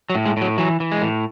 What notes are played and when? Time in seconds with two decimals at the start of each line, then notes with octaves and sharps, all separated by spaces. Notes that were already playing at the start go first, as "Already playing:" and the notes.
0.10 F#3
0.15 A2
0.26 G#3
0.37 A2 F#3
0.58 E3 F#3
0.80 E3
0.92 G#3
1.02 A2